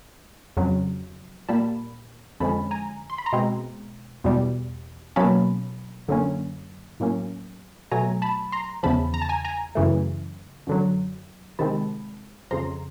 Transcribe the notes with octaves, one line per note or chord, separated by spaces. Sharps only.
F2 C#3 F#3
A#2 G3 A#3 A5 B5
F2 D3 F3 G#3 C#4 A5 B5
G#5 A#5
C6
B5
A#5 C6
B2 G#3 C4
E2 B2 G3
B2 F#3 A#3 C#4 A5 B5
F#2 D3 F#3 A#3 C#4
A2 F#3 A#3 C#4
B2 F#3 A3 G#5 A#5
A5 B5
A#5 C6
E2 C#3 F3 A5 B5
A#5
A5
G#5 A#5
G#5 A#5
F#2 C#3 E3 A3
F#2 D3 F#3
C3 D#3 G#3 C4 A5 B5
F2 C#3 F3 A#5 C6